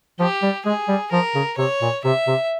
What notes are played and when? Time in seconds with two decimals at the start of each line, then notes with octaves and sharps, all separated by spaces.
0.19 F3 G4
0.43 G3
0.66 G#3 G#4
0.89 G3
1.12 F3 A#4
1.35 C#3
1.58 C3 C#5
1.82 A#2
2.05 C3 E5
2.27 C3